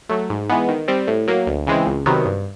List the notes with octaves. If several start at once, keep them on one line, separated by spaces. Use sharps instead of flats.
F#3 A3
G#2
E3 G#3 B3
D#3
G3 C4
A2
F#3 A#3
D2
C#3 E3 G#3 C4
C#2
C3 D#3 F#3 B3
G2